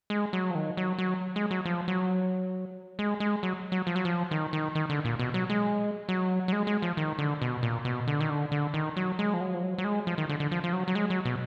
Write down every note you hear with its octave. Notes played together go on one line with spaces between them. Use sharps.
G#3
F#3
F3
D#3
F#3
F#3
G#3
F#3
F3
F#3
G#3
G#3
F#3
F#3
F3
F#3
F3
D#3
D#3
D#3
D3
A#2
B2
F#3
G#3
F#3
F#3
G#3
G#3
F3
D#3
D3
B2
A#2
B2
D3
D#3
D3
D3
D#3
F#3
G#3
F3
F#3
F3
F#3
F#3
G#3
F3
D#3
D3
D3
F3
F3
F#3
F#3
G#3
F#3
B2